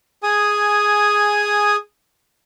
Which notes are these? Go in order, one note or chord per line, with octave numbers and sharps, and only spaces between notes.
G#4 G#5 D#6